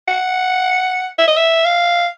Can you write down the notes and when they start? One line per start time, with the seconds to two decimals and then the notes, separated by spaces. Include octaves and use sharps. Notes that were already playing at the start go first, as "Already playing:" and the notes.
0.08 F#5
1.18 E5
1.28 D#5
1.37 E5
1.65 F5